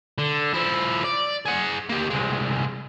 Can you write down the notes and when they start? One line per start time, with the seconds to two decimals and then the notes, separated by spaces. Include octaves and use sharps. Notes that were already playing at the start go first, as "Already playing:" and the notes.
0.18 D3
0.54 F3 E4
1.04 D5
1.45 G#4 F#5
1.89 A#3 G4
2.10 C2 G#3